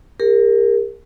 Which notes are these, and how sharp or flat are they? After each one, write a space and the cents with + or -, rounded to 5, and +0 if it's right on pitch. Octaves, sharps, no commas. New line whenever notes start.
G4 +45 A#4 +0